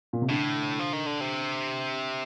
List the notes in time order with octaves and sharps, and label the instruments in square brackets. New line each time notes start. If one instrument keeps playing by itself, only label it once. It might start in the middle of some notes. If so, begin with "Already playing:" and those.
[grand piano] A#2
C3
[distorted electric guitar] A2 [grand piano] D3
[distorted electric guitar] F3
D#3
D3
C3